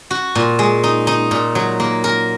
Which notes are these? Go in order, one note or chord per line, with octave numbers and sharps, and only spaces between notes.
F#4
A#2
G#3
D#4
D#4
A#2
F#3
A#3
A#4